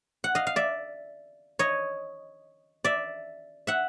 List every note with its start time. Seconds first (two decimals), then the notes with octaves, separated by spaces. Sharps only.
0.24 F#5
0.35 D#5 F5
0.47 F5
0.56 D5 E5
1.59 C#5 D#5
2.84 D5 E5
3.67 E5 F#5